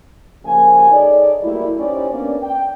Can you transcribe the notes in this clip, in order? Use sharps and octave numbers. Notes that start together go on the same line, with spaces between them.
C#3 F3 A#3 G4 G#5
D#4 G#4 A4 C#5 D5
F#3 G3 A3 A#3 E4
C#4 D#4 G4 C5 D5
A#3 B3 C#4 D4 D5
G5